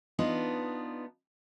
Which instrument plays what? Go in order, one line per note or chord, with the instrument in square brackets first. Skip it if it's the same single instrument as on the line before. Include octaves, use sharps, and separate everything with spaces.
[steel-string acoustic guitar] B3 D4 D#4 F4